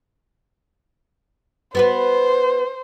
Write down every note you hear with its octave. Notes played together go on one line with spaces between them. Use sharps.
B3 F#4 B4 C5